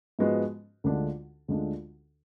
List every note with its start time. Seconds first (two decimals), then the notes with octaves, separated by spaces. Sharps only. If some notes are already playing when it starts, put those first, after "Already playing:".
0.19 G#2 F3 G#3 B3 F#4
0.84 D2 D3 G#3 D4 F4
1.48 D2 D3 G#3 D4 F4